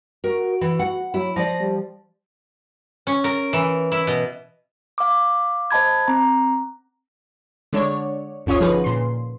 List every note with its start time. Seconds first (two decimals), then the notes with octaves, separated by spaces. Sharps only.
0.24 F#4 A#4
0.61 E3
0.79 F#5
1.14 F#3 E4
1.36 F3 D5 A#6
1.60 G3
3.07 C#4
3.24 A#4
3.53 E3
3.92 E4
4.07 B2
4.98 F5 D6
5.71 C5 D#5 A5 B5 G#6
6.08 C4 A#5
7.73 D3 G#3 D4 C#5 D5
8.46 G1 D2 C#4 F4 C#5 D#6
8.60 D3 F3 D#4 G#4 B4
8.84 A#2 C6